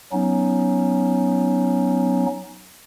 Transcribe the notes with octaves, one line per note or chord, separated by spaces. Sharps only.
F#3 B3 C#4 D#4